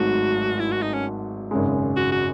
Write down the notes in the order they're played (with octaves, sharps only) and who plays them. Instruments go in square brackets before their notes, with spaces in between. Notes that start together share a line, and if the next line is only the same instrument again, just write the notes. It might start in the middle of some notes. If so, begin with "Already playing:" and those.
Already playing: [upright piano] G#1 G#2 F#3 A3 [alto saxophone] F#4
[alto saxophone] E4
F#4
D#4
C#4
[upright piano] G#1 F#2 C#3 G#3
[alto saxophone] F#4
F#4